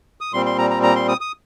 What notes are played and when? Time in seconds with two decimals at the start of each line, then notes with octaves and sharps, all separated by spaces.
0.21 D#6
0.33 A#2 G3 C4 C6
0.46 C6
0.58 A#5
0.70 A#5
0.83 A#5
0.96 C6
1.08 D#6
1.21 D#6